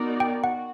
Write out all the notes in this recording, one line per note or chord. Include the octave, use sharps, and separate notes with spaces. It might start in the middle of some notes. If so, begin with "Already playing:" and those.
Already playing: B3 D#4 F#4 A#4 D5
G5
F#4 F#5